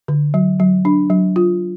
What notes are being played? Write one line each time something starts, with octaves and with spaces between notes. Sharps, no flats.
D3
F#3
F#3
D4
F#3
F4